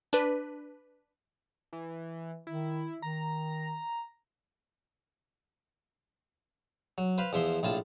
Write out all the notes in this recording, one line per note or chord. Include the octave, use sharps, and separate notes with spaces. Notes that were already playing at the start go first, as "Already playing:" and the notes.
D4 B4
E3
D#3 E4
D#3 A#5
F#3
B4 C5 F5 B5
E2 F3 E5 C6
A#1 A2 F4 A5